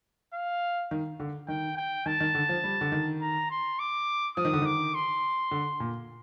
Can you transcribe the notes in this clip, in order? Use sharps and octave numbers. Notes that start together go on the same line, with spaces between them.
F5
D#3
D3
D#3 G5
G5
D#3 A5
D#3
D3
F3
G3
D3
D#3
A#5
C6
D6
F3 D#6
D#3
D3
D#3 D6
C6
D3
A#2